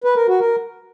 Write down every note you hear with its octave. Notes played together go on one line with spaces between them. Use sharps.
B4
A#4
F#4
A#4